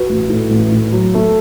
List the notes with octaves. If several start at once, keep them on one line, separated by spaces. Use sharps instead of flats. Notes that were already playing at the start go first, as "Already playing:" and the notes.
Already playing: F#4 B4
A1
A2
A1
A2
F#3
A3